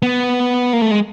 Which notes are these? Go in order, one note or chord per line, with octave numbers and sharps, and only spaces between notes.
B3
A#3
A3
G#3